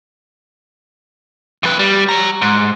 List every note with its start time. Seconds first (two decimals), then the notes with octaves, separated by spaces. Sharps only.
1.63 F2 B4
1.79 G3
2.09 C#5 A#5
2.42 G#2